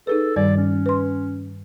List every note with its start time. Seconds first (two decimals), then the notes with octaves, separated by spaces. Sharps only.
0.07 D#4 G#4 A4 B4
0.36 G2 D#3 G3 D5
0.57 C#4
0.86 B4 C6